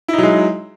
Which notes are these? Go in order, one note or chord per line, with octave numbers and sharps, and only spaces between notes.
F#3 G#3 D#4 E4